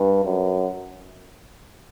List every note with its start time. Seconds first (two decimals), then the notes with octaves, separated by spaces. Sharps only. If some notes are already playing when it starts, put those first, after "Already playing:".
Already playing: G2
0.25 F#2